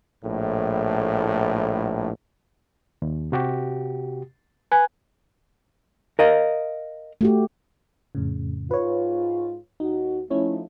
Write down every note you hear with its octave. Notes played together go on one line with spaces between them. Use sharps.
A#1 A2
D#2
C3 F#4 G4
B4 G#5 F#6 G#6
A#4 D#5 F5
A3 F#4 G4
F2 A2 C#3
G#2 F4 B4 C#5
D#2 D#4 F#4
F3 A3 C#4 D#4 E4 C#5